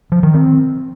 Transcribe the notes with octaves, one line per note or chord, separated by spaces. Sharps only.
F3
D#3
C4